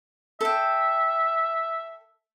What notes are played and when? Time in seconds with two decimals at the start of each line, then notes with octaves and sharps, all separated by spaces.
0.41 A4 E5 G5